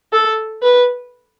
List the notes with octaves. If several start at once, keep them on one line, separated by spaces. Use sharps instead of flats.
A4
B4